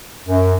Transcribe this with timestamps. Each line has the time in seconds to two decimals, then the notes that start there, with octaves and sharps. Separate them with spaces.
0.24 F#2